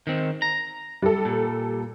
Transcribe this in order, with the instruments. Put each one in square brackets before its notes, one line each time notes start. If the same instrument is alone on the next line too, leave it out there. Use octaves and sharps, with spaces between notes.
[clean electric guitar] D#3 C4
A#5
[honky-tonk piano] G3 A4
[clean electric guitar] A#2